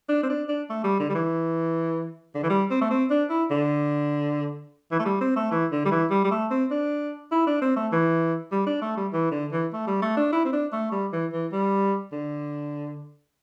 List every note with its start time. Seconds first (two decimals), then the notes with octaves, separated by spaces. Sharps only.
0.09 D4
0.23 C4
0.29 D4
0.49 D4
0.70 A3
0.84 G3
1.00 D3
1.10 G3
1.15 E3
2.35 D3
2.43 E3
2.50 G3
2.71 C4
2.81 A3
2.91 C4
3.10 D4
3.30 E4
3.50 D3
4.91 E3
4.99 A3
5.05 G3
5.21 C4
5.36 A3
5.51 E3
5.72 D3
5.85 G3
5.91 E3
6.11 G3
6.24 G3
6.31 A3
6.51 C4
6.71 D4
7.32 E4
7.47 D4
7.61 C4
7.76 A3
7.92 E3
8.52 G3
8.67 D4
8.82 A3
8.97 G3
9.13 E3
9.32 D3
9.53 E3
9.73 A3
9.87 G3
10.02 A3
10.17 D4
10.33 E4
10.45 C4
10.53 D4
10.73 A3
10.92 G3
11.13 E3
11.33 E3
11.52 G3
12.12 D3